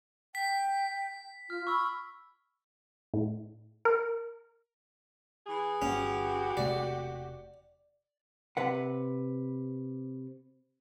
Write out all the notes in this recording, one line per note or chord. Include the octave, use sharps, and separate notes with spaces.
G5 B6
F4 F6
B5 C#6 E6
A2
A#4
E3 G#4
G1 C#4 F#4 G4
E1 C3 A3 D5
C3 B4 F#5